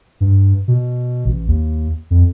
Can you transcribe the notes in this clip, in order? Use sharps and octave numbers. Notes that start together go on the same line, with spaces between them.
G2
B2
A1
D#2
F2